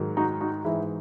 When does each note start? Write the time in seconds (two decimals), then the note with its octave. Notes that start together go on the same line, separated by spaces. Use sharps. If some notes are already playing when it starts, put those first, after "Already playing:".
Already playing: G#2 D#3 F#3
0.17 D#4 F#4
0.40 D#4 F#4
0.65 G#2 E3 E4